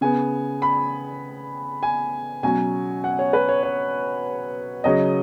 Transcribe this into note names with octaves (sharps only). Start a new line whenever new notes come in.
C#3 B3 G#5
B5
G#5
B2 F#3 C#4 G#5
F#5
C#5
B4
C#5
C#5
C#3 F#3 C#4 D#5